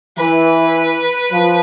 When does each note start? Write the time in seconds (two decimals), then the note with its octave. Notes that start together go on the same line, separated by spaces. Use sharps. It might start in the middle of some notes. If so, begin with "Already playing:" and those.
0.17 E3 B4
1.32 F3